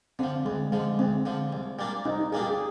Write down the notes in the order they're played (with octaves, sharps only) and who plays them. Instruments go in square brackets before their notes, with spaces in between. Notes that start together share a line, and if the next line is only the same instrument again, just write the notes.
[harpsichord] D3 F3 [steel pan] C4
[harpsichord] D2 [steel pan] G#3
[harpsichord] D3 F3 [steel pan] G#3
[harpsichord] D2 [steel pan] C4
[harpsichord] D3 F3
C2
A#2 G3 A#3 D4
[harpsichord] C2 [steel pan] D#4
[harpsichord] A#2 G3 A#3 D4 [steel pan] G#4
[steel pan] G4
G#4